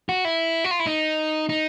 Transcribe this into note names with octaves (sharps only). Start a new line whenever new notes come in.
F#4
E4
F#4
F4
E4
D#4
D#4